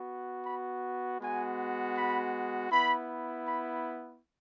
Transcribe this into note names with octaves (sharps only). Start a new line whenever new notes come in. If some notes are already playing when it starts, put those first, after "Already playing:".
Already playing: B3 F#4
B5
G#3 B3 F#4 G#5
B5
B3 E4 B5
B5